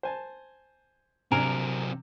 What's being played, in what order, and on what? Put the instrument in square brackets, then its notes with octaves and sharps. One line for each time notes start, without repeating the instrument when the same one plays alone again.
[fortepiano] C5 G#5 A5
[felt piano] C3 [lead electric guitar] F#3 C4 [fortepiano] D4 G#5 [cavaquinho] A#4